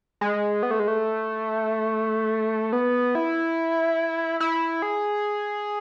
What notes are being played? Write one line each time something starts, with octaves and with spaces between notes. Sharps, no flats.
G#3
B3
A3
G#3
A3
B3
E4
E4
G#4